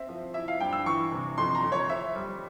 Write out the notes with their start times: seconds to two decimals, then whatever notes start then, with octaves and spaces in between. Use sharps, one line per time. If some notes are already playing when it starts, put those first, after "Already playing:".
Already playing: C4 E5
0.09 F3
0.34 E4 E5
0.48 F5
0.60 G2 G5
0.73 E6
0.86 E3 C#6
1.12 C3
1.38 F2 C6
1.55 A#5
1.64 F2
1.72 C#5
1.90 C4 E5
2.16 G3